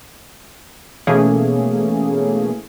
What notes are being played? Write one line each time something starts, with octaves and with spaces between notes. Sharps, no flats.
B2 E3 A3 A#3 C#4 G#4